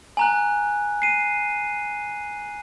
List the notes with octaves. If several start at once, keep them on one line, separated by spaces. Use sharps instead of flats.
G#5 A#5 F#6
C7 D#7